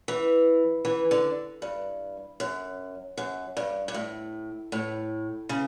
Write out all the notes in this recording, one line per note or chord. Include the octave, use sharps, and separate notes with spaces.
E3
E3
D3
G2
F#2
F#2
G2
G2
A2
A2
C#3